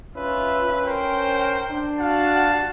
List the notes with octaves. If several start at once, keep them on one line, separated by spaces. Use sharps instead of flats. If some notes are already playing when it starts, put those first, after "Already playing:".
C#4 F4 B4 E5
A#4 C5 G5
D4
F#4 F5 F#5 A5